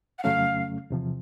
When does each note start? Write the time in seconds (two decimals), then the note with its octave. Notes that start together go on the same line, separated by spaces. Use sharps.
0.19 F#5
0.23 F2 C#3 F#3 A3 C#4 F5
0.90 E2 C3 F3